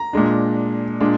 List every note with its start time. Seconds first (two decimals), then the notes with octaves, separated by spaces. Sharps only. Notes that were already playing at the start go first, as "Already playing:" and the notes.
Already playing: A#5
0.13 A#2 G#3 D4
1.00 A#2 G#3 D4